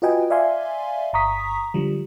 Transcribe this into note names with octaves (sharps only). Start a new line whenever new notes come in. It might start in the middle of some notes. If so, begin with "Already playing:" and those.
F4 F#4 B4 D#5 G5 G#5
D5 E5 F5 G#5 C6
G1 A#5 C#6 D#6 B6
D3 F3 G3